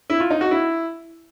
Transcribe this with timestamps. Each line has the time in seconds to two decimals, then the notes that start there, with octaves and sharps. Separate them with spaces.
0.10 E4
0.20 F4
0.30 D#4
0.41 F#4
0.51 E4